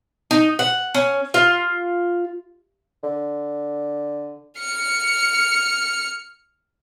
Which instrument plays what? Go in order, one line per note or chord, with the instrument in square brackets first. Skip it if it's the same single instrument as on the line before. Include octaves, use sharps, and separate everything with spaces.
[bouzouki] D#4
F#5
C#4
F4
[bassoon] D3
[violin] F6 C#7